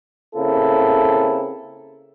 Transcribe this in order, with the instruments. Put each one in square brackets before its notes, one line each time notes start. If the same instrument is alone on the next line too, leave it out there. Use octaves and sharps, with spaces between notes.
[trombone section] C#3 A#3 C4 E4 A4